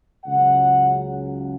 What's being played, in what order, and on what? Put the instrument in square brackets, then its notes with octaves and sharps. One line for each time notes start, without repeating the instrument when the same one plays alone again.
[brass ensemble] C#2 C#3 F#3 F#5